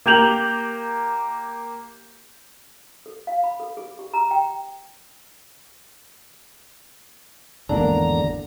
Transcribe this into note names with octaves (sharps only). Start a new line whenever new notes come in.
A#3 G4 G6 F7 F#7
A4
F5
B5
A4
G#4
G4
A#5
G5
G#1 E2 D3 A#3 D4 A#5